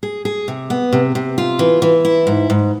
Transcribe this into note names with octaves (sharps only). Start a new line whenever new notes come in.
G#4
G#4
C3
B3
C3
C3
F4
E3
E3
E4
G#2
G#2